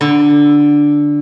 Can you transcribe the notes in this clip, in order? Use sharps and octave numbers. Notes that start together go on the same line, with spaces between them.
D3